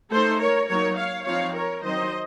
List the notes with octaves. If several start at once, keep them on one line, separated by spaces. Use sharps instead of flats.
A3 D#4 A4 C5
A#4 C#5
F#3 A#3 D#4 A#4 C#5
C#5 F5
F3 C4 D#4 C#5 F5
A#4 C#5
D#3 F#3 C4 D#4 C5 D#5